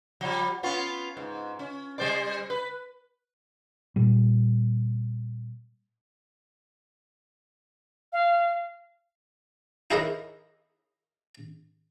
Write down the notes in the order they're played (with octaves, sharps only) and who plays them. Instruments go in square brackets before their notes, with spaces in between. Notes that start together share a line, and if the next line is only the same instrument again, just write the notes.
[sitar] F3 G3
B3 C#4 F4
G#2
C#4
G3 C5 D5
B4
[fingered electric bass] A#2 G3
[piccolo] F5
[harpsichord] D#4 E4 G#4 A#4 B4 C#5